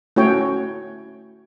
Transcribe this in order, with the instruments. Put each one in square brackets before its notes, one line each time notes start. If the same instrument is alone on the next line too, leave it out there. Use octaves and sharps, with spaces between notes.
[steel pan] A3 C#4 E4 F#4 C#5 G5